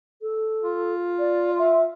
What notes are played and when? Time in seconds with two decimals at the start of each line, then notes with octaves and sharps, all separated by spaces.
0.22 A4
0.62 F4
1.19 D5
1.59 E5